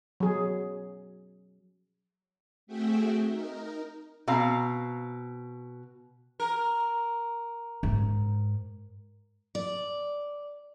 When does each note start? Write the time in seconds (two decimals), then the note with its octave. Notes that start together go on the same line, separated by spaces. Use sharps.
0.20 F#3 G#4
2.67 A3 C4 F#4 G#4 E5 G5
3.26 D#4 A#4
4.28 B2 C4 F5 A#5
6.40 A#4
7.83 G#2
9.55 D5